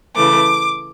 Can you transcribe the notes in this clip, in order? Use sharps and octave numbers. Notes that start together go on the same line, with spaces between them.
C#3 E3 A3 D6